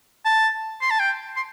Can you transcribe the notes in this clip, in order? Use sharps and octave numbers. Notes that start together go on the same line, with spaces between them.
A5
C6
A5
G5
C6